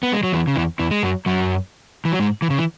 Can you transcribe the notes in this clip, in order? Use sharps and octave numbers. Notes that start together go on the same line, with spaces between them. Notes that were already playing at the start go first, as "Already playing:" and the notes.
B3
G#3
F#3
E2 E3
C#3
E2 E3
E2 E3
G#3
F#2 F#3
F#2 F#3
E3
F#3
G#2 G#3
E3
C#3
E3